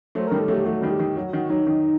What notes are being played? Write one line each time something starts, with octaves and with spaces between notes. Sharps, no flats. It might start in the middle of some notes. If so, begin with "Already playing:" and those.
F#3 A3 C5
D#3 G3 A#4
A4
F#3 A3
G4
F#3 A3 F#4
D#3 G3
G4
D#3
F#3 F#4
D#3 F#4
F#3 D#4
D#3